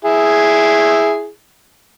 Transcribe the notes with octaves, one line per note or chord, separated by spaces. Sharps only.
E4 G#4